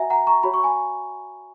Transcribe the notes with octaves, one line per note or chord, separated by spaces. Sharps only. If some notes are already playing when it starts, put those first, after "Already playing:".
Already playing: F#4 E5 F#5 G#5 A#5
F#5 A#5
A#5 C#6
F#4 C#5 B5
C#6
G#5 B5